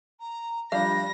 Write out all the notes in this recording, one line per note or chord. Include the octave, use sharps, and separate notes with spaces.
A#5
F3 G3 D4 F5 B5 A#6